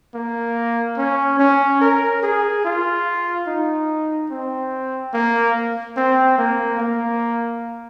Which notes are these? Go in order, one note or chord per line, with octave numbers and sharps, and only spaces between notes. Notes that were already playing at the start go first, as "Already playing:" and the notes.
A#3
C#4
C#4
A#4
G#4
F4
D#4
C4
A#3
C4
A#3
A#3